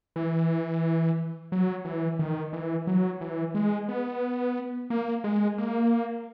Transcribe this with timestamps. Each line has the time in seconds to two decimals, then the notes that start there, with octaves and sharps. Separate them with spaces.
0.16 E3
1.52 F#3
1.85 E3
2.19 D#3
2.53 E3
2.87 F#3
3.21 E3
3.55 G#3
3.88 B3
4.90 A#3
5.24 G#3
5.58 A#3